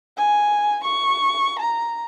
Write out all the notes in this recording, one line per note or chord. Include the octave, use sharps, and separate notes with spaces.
G#5
C#6
A#5